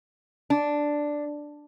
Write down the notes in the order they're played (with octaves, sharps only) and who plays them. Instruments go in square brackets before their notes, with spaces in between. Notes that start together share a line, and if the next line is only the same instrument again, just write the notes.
[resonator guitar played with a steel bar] D4